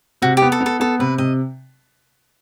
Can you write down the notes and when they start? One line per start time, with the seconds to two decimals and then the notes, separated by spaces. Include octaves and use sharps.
0.22 C3 F#4
0.37 G4
0.42 B3
0.52 A4
0.60 B3
0.66 A4
0.80 B3 A4
0.99 C3 B4
1.18 C3 D#5